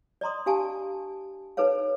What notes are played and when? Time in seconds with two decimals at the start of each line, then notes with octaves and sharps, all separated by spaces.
0.21 D5 D#5 A#5 C6 D#6
0.46 D4 G4 F5 G#5 A5
1.57 D#4 A4 B4 C#5 F5